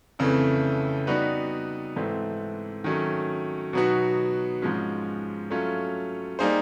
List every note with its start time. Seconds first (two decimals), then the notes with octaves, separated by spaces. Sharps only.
0.19 F2 C#3 E3 A3
1.07 G3 B3 D#4 F#4 B4
1.96 G#2 E3 A3 C4
2.84 D#3 F#3 A3 C#4
3.73 B2 F#3 B3 D#4 F#4
4.62 G#2 F3 G#3 C#4
5.50 F#3 A3 C#4 F4
6.39 G3 A#3 D#4 G#4 C5